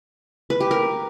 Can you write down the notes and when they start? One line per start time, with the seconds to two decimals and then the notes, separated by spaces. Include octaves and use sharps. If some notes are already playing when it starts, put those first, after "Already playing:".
0.50 B4
0.60 G4
0.71 A#4